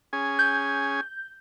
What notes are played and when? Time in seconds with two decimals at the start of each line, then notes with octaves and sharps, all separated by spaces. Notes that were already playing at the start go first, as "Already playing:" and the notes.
0.13 C#4 G#4 G#5
0.39 G6